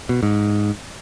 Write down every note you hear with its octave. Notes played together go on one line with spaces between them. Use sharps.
B2
G#2